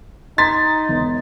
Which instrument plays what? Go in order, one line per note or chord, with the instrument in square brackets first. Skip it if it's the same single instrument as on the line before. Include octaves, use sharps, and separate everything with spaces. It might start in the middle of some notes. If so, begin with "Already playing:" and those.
[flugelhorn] D#4 [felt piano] A#5 G#6 B6 [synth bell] C6 [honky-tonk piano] A6
[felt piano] E1